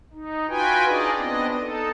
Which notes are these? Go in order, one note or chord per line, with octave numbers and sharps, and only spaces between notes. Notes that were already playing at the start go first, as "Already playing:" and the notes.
D#4
F4 F#4 B4 G5 G#5
D4 D#4 F4 G#4 D5 D#5
B3 C4 D4 D#5
D#4 A4